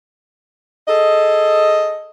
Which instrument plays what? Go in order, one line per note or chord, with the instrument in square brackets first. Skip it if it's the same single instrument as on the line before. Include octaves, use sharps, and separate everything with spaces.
[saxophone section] G#4 A4 D#5